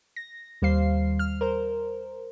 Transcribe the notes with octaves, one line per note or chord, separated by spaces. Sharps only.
A#6
D#2 G3 C5 F5 C7
F6
A#4 C5